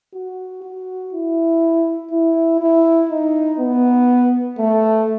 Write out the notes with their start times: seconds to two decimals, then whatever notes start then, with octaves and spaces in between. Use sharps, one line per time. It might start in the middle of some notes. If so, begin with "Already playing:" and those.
0.14 F#4
0.63 F#4
1.13 E4
2.12 E4
2.60 E4
3.10 D#4
3.59 B3
4.58 A3